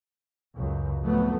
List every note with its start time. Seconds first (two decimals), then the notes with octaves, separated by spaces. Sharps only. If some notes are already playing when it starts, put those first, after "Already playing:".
0.55 C#2 F#2
1.01 F2 A2 F#3 A3 B3